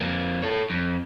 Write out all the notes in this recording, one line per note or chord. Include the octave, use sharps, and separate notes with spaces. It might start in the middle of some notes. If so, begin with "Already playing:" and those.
F2 A#3
A4 C#5
F2